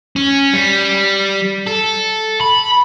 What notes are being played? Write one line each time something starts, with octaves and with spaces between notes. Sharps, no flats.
C#4
G3
A4
B5